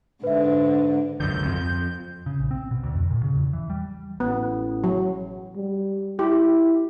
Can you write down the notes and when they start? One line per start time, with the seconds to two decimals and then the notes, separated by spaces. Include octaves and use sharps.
0.23 G#2 D3 B4 E5
1.20 C#2 F#2 D3 G6
1.45 F2 C4
2.26 C#3
2.39 A#1
2.51 C4
2.71 B2
2.83 D2
2.95 F2
3.10 A#2
3.23 C#3
3.36 E2
3.53 E3
3.70 G3
4.20 A1 B3
4.84 F#3
5.56 G3
6.19 E4 G4